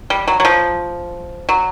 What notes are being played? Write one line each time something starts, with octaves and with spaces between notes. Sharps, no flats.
G3
F#3
F#3
F3
F#3